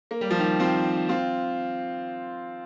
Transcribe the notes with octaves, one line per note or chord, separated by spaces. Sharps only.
A#3
G3
F3
D#3 G3
C4 F4
C4 F4